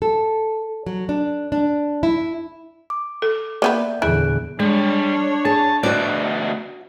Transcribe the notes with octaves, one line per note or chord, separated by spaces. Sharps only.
A4
F#3
D4
D4
E4
D6
A4
A#3 B3 B4 D5 E5 G6
E2 A#2 D3 E4 G#4 F#6 D7
G3 G#3 D4 C#5
G#4 A5
D2 B2 F#4 D5